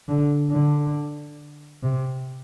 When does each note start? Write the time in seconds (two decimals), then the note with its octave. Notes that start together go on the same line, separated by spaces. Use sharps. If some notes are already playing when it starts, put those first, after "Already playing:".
0.08 D3
0.51 D3
1.83 C3